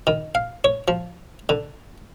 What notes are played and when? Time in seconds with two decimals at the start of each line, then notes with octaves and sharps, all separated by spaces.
0.07 D#3
0.35 F5
0.64 C#5
0.88 F3
1.49 D3